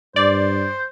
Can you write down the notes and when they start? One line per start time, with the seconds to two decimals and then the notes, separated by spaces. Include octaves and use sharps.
0.16 G2 C5 D5